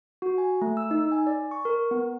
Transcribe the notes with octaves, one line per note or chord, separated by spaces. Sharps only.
F#4
G#5
A3
E6
D#4
G#5
D5
C#6
A#4
B3